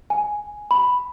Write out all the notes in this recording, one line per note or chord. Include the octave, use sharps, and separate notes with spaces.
G#5
B5